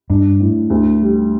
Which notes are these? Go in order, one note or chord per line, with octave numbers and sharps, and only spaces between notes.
G2 D4
A2
D2
G3